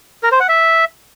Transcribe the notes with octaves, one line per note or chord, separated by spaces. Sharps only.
A#4
C5
F#5
E5